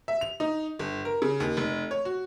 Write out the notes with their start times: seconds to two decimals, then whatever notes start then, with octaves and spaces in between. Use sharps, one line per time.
0.08 E5
0.21 F7
0.40 D#4
0.79 G1
1.05 A#4
1.22 C#3
1.40 D#2
1.57 F1
1.91 C#5
2.05 F#4